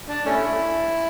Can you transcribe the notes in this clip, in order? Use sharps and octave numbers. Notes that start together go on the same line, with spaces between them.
D4
A3 C#4 E4